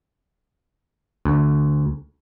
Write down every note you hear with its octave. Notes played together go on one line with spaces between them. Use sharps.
D2